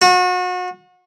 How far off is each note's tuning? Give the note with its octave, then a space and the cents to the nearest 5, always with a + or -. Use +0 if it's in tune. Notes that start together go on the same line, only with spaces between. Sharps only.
F#4 -35